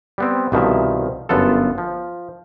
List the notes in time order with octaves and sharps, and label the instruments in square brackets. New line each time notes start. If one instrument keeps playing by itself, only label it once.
[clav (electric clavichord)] G3 B3 C4
C2 B2 D#3 F3 E5
G1 F#2 B3 F4 A4
F3